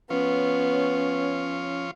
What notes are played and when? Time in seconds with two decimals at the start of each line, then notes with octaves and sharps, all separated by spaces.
0.10 F3 B3 C#4 F4 C#5